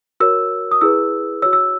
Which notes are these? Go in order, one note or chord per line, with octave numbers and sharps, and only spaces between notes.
F#4 A#4 C#5 E6
D#6
E4 G#4 B4 E6
F#4 C#5 E6
E6